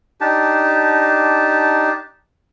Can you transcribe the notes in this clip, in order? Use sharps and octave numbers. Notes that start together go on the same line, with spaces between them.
D4 D#4 G4 A5